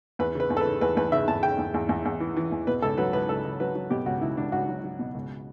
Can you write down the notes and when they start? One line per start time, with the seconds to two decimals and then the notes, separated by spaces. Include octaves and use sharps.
0.19 E2 B4
0.35 C#3 B4
0.50 E2
0.57 A4
0.61 B4
0.65 C#3
0.81 E2 B4
0.97 E2 B4
1.12 C#3 E5
1.28 E2 A5
1.43 C#3 G5
1.58 E2
1.74 E2
1.89 E2
2.05 E2
2.20 E3
2.37 E3
2.52 E2
2.67 B2 B4
2.82 C#2 A4
2.97 F#3 B4
3.13 C#2 B4
3.29 C#2 A4
3.45 C#2
3.60 F#3 B4
3.75 F#3
3.90 B2 G4
4.06 C#2 F#4
4.22 C#2 E4
4.37 C#2 D4
4.52 C#2 F#4
4.68 F#3
4.84 F#3
4.99 B2
5.15 C#2